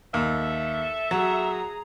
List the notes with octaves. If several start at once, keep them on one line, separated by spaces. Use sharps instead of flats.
D#2 A4 E5
F#3 G#4 A#5